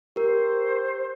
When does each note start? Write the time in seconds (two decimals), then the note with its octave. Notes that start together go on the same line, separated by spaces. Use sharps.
0.16 G4 A#4 C5